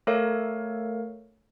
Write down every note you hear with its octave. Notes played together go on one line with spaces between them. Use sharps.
A3 A4 A#4 C#5 F5